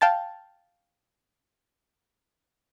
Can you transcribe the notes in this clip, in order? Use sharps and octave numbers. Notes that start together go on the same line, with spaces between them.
F5 G5 A5 A6